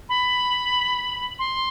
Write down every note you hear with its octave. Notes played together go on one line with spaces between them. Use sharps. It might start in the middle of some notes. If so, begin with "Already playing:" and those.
B5
C6